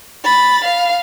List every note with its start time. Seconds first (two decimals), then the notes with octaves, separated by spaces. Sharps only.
0.24 B5 A6
0.64 F5